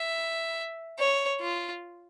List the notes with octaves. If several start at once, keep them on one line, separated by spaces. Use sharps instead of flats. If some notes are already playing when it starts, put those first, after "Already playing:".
Already playing: E5
C#5
F4